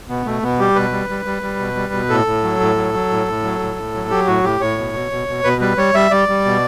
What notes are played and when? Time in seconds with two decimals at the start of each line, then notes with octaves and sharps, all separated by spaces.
0.09 B2 B3
0.26 B2 A3
0.43 B2 B3
0.59 G3 G4
0.76 B2 B4
0.92 G3
1.09 G3
1.25 G3
1.43 G3
1.59 B2
1.76 G3
1.94 B2
2.10 A2 A4
2.26 A2
2.44 F#3
2.60 A2
2.76 F#3
2.94 F#3
3.10 A2
3.27 A2
3.44 F#3
3.60 A2
3.76 A2
3.94 F#3
4.10 F#3 G4
4.27 A2 F#4
4.44 A2 G4
4.60 A2 C#5
4.78 B2
4.94 B2
5.12 B2
5.28 B2
5.44 B2 B4
5.61 G3 B4
5.77 G3 C#5
5.95 G3 E5
6.11 G3 D5
6.29 G3
6.45 B2